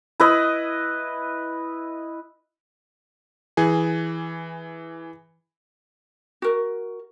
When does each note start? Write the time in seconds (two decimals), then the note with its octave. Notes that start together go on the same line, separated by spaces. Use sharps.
0.20 E4 B4 D#5
3.57 E3 G#4
6.42 F#4 A#4